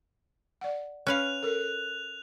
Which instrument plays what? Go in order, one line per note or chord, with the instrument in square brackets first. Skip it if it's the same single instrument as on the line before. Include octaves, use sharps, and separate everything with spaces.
[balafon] D5 F#5
[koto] C#4 B4 F5 [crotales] F#6 F7
[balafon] A4 A#4